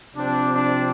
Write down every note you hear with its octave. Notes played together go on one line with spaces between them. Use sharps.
C3 F3 C4 D4
D4